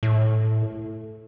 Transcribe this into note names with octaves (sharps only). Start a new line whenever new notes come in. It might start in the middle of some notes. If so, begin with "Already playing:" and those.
A2